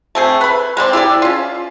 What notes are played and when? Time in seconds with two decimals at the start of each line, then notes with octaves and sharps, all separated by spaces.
0.15 A3 C4 G#4
0.41 B4 B5
0.77 G#3 C4 D5
0.93 E4 G4 G#4 D5
1.22 C#4 F4